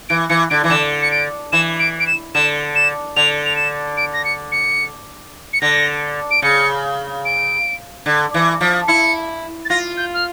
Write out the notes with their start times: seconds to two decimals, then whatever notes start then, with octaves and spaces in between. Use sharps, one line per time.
0.09 E3 D7
0.29 E3 C#7
0.50 D3 D7
0.64 E3
0.70 D3 E7
1.02 C#7
1.11 D7
1.52 E3 E7
1.80 D7
2.00 D7
2.07 E7
2.35 D3 E7
2.75 E7
3.16 D3 F7
3.46 F7
3.56 E7
3.97 D7
4.13 A#6
4.25 C#7
4.52 C#7
5.53 C#7
5.61 D3 A#6
6.31 D7
6.42 C#3 C#7
7.25 D7
8.06 D3
8.34 E3
8.61 F3
8.88 E4 C#7
9.65 A6
9.69 F4 A#6
9.97 G6
10.14 F6